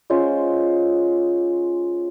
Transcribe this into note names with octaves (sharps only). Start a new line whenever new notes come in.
G#3 C#4 F4 C5